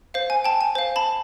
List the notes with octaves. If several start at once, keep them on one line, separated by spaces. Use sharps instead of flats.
C5 F5
G#5
G5 A5
G#5
C5 F5
A5 B5